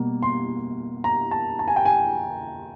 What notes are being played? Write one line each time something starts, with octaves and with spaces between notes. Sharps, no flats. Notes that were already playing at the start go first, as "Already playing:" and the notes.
Already playing: B2 G3 A#3
C6
A#5
A5
A5
G#5
G5
G#5